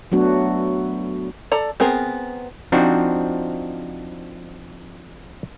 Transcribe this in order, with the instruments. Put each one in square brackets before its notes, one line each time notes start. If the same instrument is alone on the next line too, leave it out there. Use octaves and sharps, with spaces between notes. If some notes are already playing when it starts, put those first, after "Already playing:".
[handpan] F#3 A3 B3 D4 F#4
[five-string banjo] A4 D5 A#5
B3 C4 G#4 A#4
[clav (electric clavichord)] F3 C4 D4 D#4 F#4